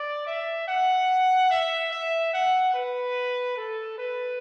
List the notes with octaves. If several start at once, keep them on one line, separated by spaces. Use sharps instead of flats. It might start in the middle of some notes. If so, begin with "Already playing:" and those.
Already playing: D5
E5
F#5
E5
E5
F#5
B4
A4
B4